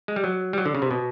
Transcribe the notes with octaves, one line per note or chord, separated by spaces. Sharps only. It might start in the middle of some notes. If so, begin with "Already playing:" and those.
G#3
G3
F#3
G3
F#3
D3
C#3
C3
B2